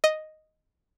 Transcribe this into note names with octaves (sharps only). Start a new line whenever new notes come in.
D#5